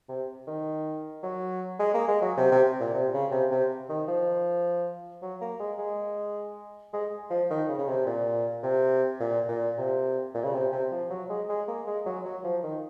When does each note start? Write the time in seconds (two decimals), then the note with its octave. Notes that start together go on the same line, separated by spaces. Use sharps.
0.09 C3
0.47 D#3
1.23 F#3
1.80 G#3
1.94 A#3
2.08 G#3
2.22 F#3
2.37 C3
2.52 C3
2.80 A#2
2.94 C3
3.13 C#3
3.31 C3
3.51 C3
3.89 D#3
4.08 F3
5.22 F#3
5.41 A#3
5.60 G#3
5.79 G#3
6.93 G#3
7.30 F3
7.50 D#3
7.69 C#3
7.79 C#3
7.88 C3
8.06 A#2
8.63 C3
9.20 A#2
9.49 A#2
9.78 C3
10.34 A#2
10.44 C#3
10.54 C3
10.72 C3
10.92 F3
11.10 F#3
11.30 G#3
11.49 G#3
11.68 A#3
11.87 G#3
12.06 F#3
12.25 F#3
12.44 F3
12.63 D#3